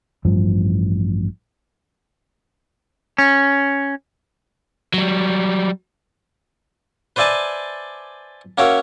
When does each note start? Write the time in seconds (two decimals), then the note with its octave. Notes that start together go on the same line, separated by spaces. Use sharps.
0.25 A1 G2 F3
3.18 C#4
4.94 F#3 G3
7.16 B4 C5 D5 E5 G#5 A5
8.58 A#3 C#4 F#4 A#4 C#5 E5